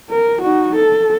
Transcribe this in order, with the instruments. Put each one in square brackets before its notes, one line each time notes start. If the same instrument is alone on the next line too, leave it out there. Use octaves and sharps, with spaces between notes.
[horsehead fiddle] A#4
D#4 F#4
A4